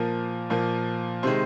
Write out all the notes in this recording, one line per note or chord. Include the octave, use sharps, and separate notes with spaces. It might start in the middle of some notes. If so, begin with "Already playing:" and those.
Already playing: A#2 F3 A#3 A#4
A#2 F3 A#3
C3 D#3 G#3 C5